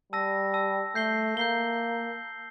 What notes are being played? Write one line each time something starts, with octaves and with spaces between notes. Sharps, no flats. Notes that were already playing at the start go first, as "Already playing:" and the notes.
G3 A5 E6 A#6
A5 E6 A#6
A3 G6 C7 G7
A#3 G6 C7 G7